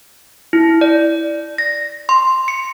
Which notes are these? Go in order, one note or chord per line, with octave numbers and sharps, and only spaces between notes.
E4
D5
A#6
C6
C#7